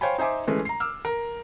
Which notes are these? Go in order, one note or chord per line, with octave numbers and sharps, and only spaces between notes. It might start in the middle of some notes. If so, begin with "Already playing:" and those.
C5 C#5 F5 G5 G#5 B5
D#4 C5 E5 G#5 D6
E3 G#3 A3 C#4
A#5 C7
D6 E6 F6
A#4